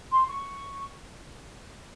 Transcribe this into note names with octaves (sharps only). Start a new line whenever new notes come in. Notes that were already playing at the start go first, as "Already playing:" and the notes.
C6
C#6